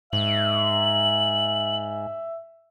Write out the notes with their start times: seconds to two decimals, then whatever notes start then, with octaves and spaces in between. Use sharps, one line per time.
0.13 G#2 E5 F#7